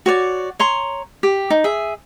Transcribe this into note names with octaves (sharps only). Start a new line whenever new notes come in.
F#4 C#5 D5
C#5 A#5 C6
G4
D#4
G#4 E5